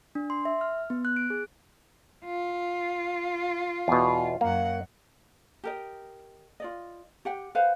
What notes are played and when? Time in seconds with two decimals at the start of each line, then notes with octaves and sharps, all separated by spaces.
0.15 D4
0.30 C6
0.45 E5
0.61 F6
0.90 B3
1.05 F#6
1.16 D7
1.30 G#4
2.25 F4
3.88 E2 B2
4.41 F#2 A#3 F#5
5.64 G4 A#4 D#5
6.60 F4 D5 D#5
7.25 G4 F#5 G5
7.55 B4 C5 F5 F#5